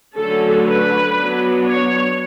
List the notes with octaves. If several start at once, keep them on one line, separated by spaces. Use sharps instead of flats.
D3 F#3 A3 C#4 A4
B4
F#3 B3 D4
C#5